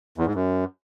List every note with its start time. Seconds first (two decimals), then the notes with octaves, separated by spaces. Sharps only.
0.18 E2
0.26 G#2
0.35 F#2